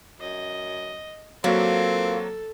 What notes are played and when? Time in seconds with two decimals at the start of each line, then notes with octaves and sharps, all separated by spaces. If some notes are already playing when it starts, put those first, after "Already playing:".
0.20 F#2 D#5
1.44 A#2 F#3 A#3 C4 F#4 A4